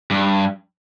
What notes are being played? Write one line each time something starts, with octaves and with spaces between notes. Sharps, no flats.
G2